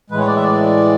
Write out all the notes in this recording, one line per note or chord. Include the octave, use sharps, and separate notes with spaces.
A2 E3 G#3 B4
C#5
D5
E5
D5